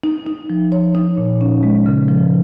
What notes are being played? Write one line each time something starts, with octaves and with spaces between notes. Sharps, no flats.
D#4
D#4
F3
C#5
D#4
A#2
C#4
G#3
C#3
F3